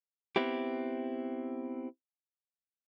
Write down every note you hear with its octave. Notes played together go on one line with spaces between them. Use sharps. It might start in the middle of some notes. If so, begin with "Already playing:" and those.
B3 C4 E4 G4